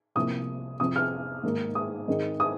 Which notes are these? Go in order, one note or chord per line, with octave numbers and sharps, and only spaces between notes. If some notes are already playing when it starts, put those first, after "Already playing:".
C2 C3 F3 A#3 D#6
F2 C3 F3 D#6
F6
G#2 D#3 A#3
D#6
G#2 D#3 G#3 C4
D#6